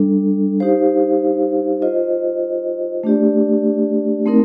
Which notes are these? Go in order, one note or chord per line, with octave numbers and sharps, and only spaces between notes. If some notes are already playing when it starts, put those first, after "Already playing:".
Already playing: G3 D4 A4
D#4 G4 C5 F5
F4 C5 D#5
A3 D4 G4 D5
A3 C4 D#4 A#4